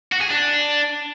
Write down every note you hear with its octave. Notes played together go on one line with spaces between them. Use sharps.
F#4
G#4
D4